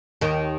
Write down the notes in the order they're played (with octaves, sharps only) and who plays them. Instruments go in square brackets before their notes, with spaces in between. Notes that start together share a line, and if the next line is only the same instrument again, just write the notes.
[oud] D#2 D#3